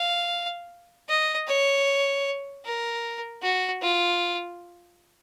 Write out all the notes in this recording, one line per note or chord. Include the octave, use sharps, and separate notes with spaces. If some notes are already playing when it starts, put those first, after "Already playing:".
Already playing: F5
D#5
C#5
A#4
F#4
F4